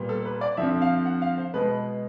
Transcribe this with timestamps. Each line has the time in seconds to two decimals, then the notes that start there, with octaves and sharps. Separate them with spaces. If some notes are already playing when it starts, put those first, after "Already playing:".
Already playing: A#2 G3 B3
0.09 A4
0.25 B4
0.41 D5
0.57 F2 D3 F3 E5
0.82 F5
1.06 F#5
1.22 F5
1.38 C5
1.54 B2 G#3 B3 B4